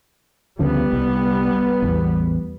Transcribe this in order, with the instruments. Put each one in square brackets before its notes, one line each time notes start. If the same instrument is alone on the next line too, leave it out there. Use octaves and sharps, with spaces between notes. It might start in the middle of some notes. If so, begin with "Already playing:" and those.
[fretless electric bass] D2 C#3 F3 [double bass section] G3 B3
[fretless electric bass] C2
A1 E2